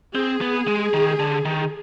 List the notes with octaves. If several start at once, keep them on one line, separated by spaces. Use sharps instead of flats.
C4 G#4
B3
G#3
D#3
D3
D#3